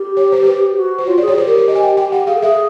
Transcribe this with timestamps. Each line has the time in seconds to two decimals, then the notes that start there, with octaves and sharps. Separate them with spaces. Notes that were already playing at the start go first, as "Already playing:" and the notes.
Already playing: G4
0.17 C#5
0.32 C5
0.43 C5
0.47 B4
0.77 F#4
0.98 C5
1.07 F4 C#5
1.18 G#4 D5
1.28 C#5
1.33 F#4
1.37 G4 C5
1.47 A#4
1.58 A#4
1.68 D#5
1.75 G#5
1.83 G5
1.97 G5
2.12 F#5
2.27 G#4 F5
2.35 A4
2.42 G#4 E5